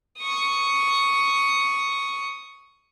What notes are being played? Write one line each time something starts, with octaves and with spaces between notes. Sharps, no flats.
C#6 D#6